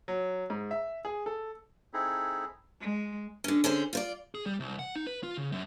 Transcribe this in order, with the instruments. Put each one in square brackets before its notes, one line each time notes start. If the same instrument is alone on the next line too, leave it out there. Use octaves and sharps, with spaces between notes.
[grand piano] F#3
G#2
E5
G#4
A4
[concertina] C4 D#4 E4 G#4 A4
[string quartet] G#3
[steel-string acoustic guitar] D3 C#4
D3 C#4 G#4 C5
F4 C5 D5
[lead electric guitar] G#4
G3
C2
F#5
D#4
B4
F4
C#3
F#2